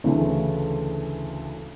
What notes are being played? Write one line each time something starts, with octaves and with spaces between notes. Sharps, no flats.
D2 C#3 E3 A3